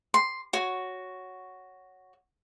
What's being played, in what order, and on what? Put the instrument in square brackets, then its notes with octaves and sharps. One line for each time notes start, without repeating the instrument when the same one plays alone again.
[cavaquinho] C6
F#4 C#5